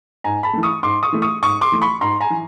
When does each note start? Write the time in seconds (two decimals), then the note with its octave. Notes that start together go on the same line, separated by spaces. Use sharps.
0.24 G#2 G#5 A#5
0.43 A5 B5
0.53 E3 A3
0.63 C#6 D#6
0.83 G#2 C6 D6
1.03 C#6 D#6
1.12 E3 A3
1.22 C#6 D#6
1.43 G#2 C#6 D#6
1.61 C6 D6
1.72 E3 A3
1.82 B5 C#6
2.01 G#2 A#5 C6
2.21 G#5 A#5
2.30 E3